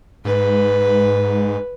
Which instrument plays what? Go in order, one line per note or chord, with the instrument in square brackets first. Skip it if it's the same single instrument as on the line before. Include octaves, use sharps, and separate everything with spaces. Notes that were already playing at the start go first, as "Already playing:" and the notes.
[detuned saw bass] G#2 [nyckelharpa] B4